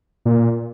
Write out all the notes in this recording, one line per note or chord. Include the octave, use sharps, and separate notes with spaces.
A#2